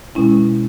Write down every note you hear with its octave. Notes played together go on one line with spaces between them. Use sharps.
B2 G#3 C#4 E4